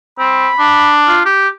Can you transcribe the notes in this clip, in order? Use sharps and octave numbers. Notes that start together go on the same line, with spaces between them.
C4 B5
D4
F4
G4